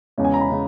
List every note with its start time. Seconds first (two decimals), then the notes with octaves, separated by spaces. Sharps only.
0.18 E2 C#3 G#3 C#4
0.25 G#5
0.34 A#5
0.41 B5
0.50 C#3 G#3